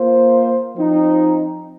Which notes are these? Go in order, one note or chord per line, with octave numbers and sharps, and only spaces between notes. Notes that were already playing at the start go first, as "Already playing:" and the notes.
Already playing: A#3 F4 C5
F3 C4 D#4